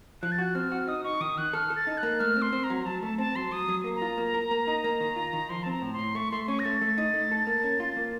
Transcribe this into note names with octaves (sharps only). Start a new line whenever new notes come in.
F3 F#6
A6
F#4 F#6
C4 F6
F#4
D#4 D#6
D#4 C#6
D#3 D#6
D#3 F#6
A4 F6
A4
A6
D#4
F#6
A#3
A3 F6
C4
C6
C4
A#5
F#3
F#3 A5
A3 A5
C4 A5
F#3 C6
F#3 D#6
F#3
A#3
A#5
F4
A#3
A#4
A#3
D#4
A#3
D#3
F4
D#3
F3 C6
C4 A5
A#5
A2
C6
A2
A3 C#6
A3 C6
C6
C#4 C#6
A#6
A3 A6
A3
D#4
A3
A4
A#3
C#4
F4
A#3